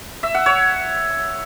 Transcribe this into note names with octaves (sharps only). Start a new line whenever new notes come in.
E5
F#5
C#5